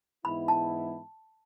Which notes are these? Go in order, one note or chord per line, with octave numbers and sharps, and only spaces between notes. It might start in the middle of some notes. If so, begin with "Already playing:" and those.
G#2 E3 G#3 B3 E4 B5
A5